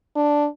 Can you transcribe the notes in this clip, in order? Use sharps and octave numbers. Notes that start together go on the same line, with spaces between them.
D4